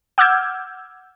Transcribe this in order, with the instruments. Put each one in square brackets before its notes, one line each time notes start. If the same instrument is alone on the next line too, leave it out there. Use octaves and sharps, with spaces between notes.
[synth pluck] F#5 D6 E6 F6 G6 G#6